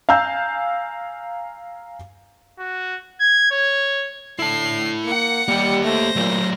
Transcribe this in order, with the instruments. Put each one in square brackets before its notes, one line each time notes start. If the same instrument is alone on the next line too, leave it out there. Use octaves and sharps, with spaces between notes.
[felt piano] F5 G#5 A#5 E6 G6
[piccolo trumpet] F#4
G#6
C#5
[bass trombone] D3 [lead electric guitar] E4 A5 [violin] C7
[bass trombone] A#3 [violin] F#5 C#7
[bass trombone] G3 [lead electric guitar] A#3 G4
[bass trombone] A3 [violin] C5 A#6
[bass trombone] A#2 [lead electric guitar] F#3 A3